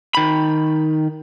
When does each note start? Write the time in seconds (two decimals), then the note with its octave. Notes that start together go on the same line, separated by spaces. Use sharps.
0.15 D#3 B5